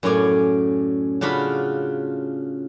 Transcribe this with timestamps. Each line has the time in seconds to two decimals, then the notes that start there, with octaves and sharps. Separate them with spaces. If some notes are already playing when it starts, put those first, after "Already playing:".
0.03 F#2 A2 C#4 D5 G#5
1.21 C#3 D4 F4 F#4 B5